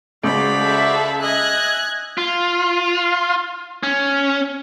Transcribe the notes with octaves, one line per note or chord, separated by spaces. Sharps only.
C#2 C#3 F#4 C5 D5 F5 B5
A4 E5
D#5 E5 G#5 F#6 G#6
F4
C#4